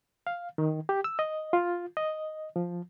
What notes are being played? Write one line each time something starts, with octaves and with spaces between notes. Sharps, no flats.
F5
D#3
G4
E6
D#5
F4
D#5
F3